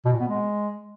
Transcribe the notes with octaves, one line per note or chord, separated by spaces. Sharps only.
B2
A#2
B3
G#3